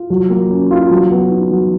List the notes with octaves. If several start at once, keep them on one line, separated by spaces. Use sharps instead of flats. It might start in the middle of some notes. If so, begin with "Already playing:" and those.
Already playing: F4
F#3
A#3
C#4
F4
F#3
B3
D#4
F#3